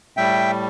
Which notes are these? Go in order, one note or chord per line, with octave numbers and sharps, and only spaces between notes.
A2 G3 E5 G5